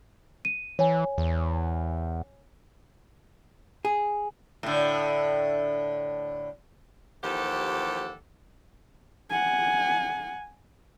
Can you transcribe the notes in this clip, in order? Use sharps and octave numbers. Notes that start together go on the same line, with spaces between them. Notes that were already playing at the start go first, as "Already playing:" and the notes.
D#7
E3 C#5 G#5
E2
G#4
A2 D3
D#2 E3 F3 G4 A4 F#5
F#5 G#5